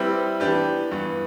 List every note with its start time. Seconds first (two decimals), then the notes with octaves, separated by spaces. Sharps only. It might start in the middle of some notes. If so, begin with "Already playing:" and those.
Already playing: G3 C4 E4 G4 B4
0.40 E3 B3 D4 G4 B4
0.91 G2 E3 B3